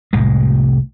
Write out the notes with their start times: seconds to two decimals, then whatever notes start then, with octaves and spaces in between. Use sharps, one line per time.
0.13 F1 C2 A2 G#3